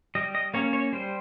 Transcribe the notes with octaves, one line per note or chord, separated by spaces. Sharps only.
G3 D#5
D#5
A#3 C#4 C#5
C#5
G3 C5